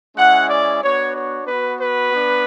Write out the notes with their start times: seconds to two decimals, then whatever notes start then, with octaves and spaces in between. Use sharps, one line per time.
0.17 G#3 C#4 E4 F#5
0.50 D5
0.82 B3 D4 F#4 C#5
1.15 C#5
1.47 B3 F#4 B4
1.81 B4
2.13 B3 D4